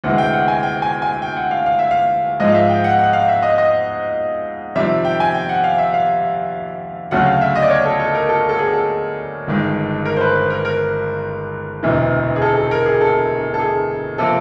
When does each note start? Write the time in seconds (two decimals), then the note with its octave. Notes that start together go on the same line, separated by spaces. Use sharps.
0.04 D2 C3 E3 G#3 F#5
0.18 G5
0.33 F#5
0.48 G#5
0.63 G5
0.82 G#5
1.02 G#5
1.22 G5
1.36 F#5
1.51 F5
1.66 F5
1.79 E5
1.91 F5
2.40 G#2 F3 G#3 D#5
2.50 F5
2.54 E5
2.69 G5
2.84 F#5
2.99 F#5
3.13 F5
3.28 E5
3.43 D#5
3.58 D#5
4.75 F2 C3 D#3 G3 E5
5.05 G5
5.20 G#5
5.34 G5
5.49 F#5
5.64 F5
5.78 E5
5.94 F5
7.11 D2 C#3 F#3 A3 C#4 F#5
7.26 F5
7.41 E5
7.55 D#5
7.62 D5
7.70 C#5
7.85 A4
8.00 A4
8.15 A#4
8.29 A4
8.49 A4
8.59 G#4
8.73 A4
9.47 G1 G2 D#3 G#3
10.05 A#4
10.17 C5
10.21 B4
10.35 B4
10.50 A#4
10.65 A#4
11.83 E1 D2 C3 E3
12.36 G#4
12.42 A4
12.57 A4
12.71 A#4
12.86 G#4
13.01 A4
13.54 A4
13.59 G#4
14.18 C3 F3 A#3 A4